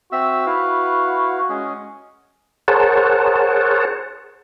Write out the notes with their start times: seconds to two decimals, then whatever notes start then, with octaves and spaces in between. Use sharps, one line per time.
0.12 C4 F#4 E5 E6
0.47 E4 B4 F5
1.49 G#3 C#4 G#4
2.68 G#4 A#4 C5 C#5 F#5 A5